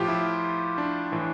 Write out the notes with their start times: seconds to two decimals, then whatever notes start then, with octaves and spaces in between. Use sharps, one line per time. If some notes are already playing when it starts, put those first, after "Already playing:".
Already playing: A2 F3 F4 G4
0.08 E4
0.78 D4
1.12 A2 E3